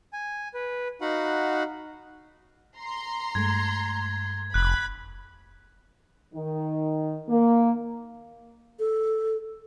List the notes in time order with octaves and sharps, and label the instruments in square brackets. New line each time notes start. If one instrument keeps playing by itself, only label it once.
[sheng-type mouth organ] G#5
B4
D#4 F#4 F5 F#5 B5
[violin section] A#5 C6
[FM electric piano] G2 G#3 A3 [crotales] G#6
[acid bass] F1 [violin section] B5 [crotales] F#6
[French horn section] D#3
A#3
[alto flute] A4